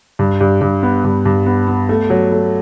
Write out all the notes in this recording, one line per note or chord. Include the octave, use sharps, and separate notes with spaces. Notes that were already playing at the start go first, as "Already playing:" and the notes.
G2
G2
G2
B3
G2
G2
B3
B3
A3
F#3
A3